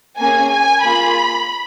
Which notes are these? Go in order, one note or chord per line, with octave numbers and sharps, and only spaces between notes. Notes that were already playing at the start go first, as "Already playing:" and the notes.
A#3 C#4 G#4 G#5
G#5
A#3 F4 G#4 B5